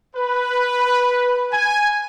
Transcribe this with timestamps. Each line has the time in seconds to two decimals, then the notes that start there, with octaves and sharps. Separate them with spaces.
0.15 B4
1.52 G#5